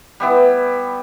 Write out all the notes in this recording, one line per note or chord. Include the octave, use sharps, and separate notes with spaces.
G3 B3 E4